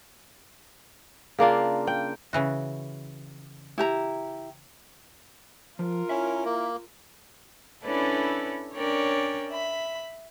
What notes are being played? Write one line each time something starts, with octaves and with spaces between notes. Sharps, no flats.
C#3 A#3 D4 F4
G5
C#3 E3 F#4
E4 G4 A#5
F3 F4 A#4
C#4 E4 E5
A#3
C#4 D4 E4 A4 B4 D5
C#4 D4 A#4 C#5 D5 G5
E5 B5